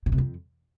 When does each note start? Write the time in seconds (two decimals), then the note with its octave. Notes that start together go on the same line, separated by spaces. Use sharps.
0.06 B2
0.12 C3
0.18 F2